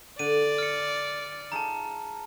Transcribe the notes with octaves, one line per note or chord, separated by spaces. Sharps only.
D3 D5 D#7
F6 C#7
D#4 F4 G#4 A5 A#5